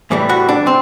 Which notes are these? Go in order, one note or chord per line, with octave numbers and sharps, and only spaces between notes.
A2 E3 G3
F#4
D4
C4